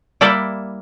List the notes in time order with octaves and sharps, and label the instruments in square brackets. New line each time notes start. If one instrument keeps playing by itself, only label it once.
[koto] G3 A#3 E4 A4 D5 E5